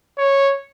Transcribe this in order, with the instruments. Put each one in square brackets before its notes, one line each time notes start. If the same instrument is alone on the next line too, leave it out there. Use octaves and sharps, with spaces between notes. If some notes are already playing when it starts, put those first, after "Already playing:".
[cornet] C#5